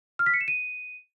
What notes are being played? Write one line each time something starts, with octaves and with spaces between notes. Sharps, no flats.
F6
B6
C#7
E7
D#7